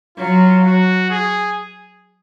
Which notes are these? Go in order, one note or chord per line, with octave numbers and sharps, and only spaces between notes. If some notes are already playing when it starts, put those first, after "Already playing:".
F#3 F4
F#4
G#4